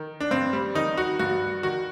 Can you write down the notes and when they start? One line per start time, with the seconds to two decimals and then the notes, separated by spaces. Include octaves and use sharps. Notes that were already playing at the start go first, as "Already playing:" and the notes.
Already playing: D#3
0.20 D4
0.31 G2 C4
0.53 G3
0.75 D#3 D#4
0.97 F#4
1.19 G2 F#4
1.63 D#3 F#4